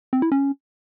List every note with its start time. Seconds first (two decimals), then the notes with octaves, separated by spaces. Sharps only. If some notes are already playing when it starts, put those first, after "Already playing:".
0.13 C4
0.22 E4
0.32 C#4